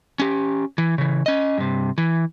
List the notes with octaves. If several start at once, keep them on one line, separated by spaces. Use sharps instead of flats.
C#4 G4
E3
C#3 E3
C#4 D#5
G2 C3
E3